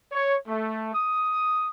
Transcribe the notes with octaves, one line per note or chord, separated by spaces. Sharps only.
C#5
A3
D#6